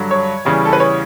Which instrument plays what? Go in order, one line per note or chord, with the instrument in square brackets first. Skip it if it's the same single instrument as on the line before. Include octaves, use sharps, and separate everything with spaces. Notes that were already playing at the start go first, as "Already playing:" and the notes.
Already playing: [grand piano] G2 D3 F#3
C#5
E2 C#3 E3 G3
A4
B4
C#5